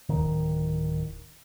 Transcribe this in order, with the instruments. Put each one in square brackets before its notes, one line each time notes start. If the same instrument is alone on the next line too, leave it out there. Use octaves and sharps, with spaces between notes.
[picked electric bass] D1 D#3